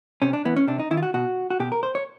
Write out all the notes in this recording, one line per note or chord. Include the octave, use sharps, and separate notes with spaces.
C3 C#4
D4
E3 B3
C#4
C3 D4
D#4
D#3 E4
F4
F#4
B2 F#4
F#4
B2 G4
A#4
C5
C#5